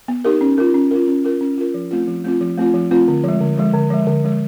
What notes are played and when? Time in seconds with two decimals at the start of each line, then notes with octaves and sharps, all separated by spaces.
0.08 B3
0.25 D#4 G4 A#4
0.41 C#4
0.58 F4 A#4
0.74 C#4
0.91 F4 A#4
1.08 C#4
1.24 F4 A#4
1.41 C#4
1.58 F4 A#4
1.74 F3
1.91 A3 C4 F4
2.08 F3
2.24 A3 C4 F4
2.41 F3
2.58 A3 C4 F4
2.74 F3
2.91 A3 C4 F4
3.08 D3
3.24 F3 G#3
3.41 D3
3.57 F3 G#3
3.74 D3
3.90 F3 G#3
4.07 D3
4.24 F3 G#3